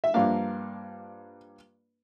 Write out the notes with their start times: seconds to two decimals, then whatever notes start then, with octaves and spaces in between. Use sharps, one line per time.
0.04 E5
0.14 G2 F3 A#3 D4 F5